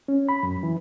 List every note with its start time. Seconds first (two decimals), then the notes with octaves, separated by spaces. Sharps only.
0.08 C#4
0.29 B5
0.43 F#2
0.63 E3